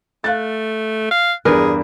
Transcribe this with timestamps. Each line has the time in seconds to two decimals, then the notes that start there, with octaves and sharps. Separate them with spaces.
0.24 A3 F5 F#6 A6
1.11 F5
1.45 E2 G2 G#4 A#4 B4